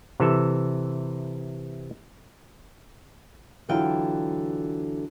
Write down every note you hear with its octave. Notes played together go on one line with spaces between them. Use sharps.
C3 E3 A4 E5
D3 E3 F#3 F4 G5